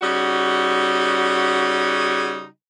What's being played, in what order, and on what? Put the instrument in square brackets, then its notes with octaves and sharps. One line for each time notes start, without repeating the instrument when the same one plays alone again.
[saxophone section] C#3 G3 D#4 F#4